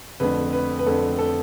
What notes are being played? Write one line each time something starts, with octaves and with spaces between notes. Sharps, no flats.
F2 D3 A3 C4 B4
B4
B4
F2 D3 A3 C4 A4
A4